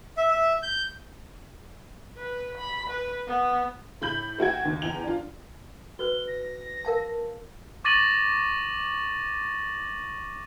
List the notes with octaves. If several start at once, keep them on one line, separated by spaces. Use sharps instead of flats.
E5
E5
G6
B4
B5
B4
B3
A2 B5 G6 F#7
A3 F#4 G5 G#6
D#2
E2 G5 F7
D4 F4
F#4 B4 C5 G7
A#6
A#4 F5 A5
C#6 D6 A6 A#6 D#7 F#7